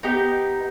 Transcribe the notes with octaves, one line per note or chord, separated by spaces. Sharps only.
B3 D#4 G4